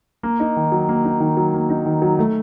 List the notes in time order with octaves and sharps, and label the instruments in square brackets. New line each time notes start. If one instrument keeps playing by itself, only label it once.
[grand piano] A#3
D#4
D#3
F#3
A#3
D#4
D#3
F#3
A#3
D#4
D#3
F#3
A3